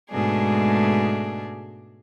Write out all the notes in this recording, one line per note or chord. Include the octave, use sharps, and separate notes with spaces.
G#2 B2 G#3 A3 D4 G#4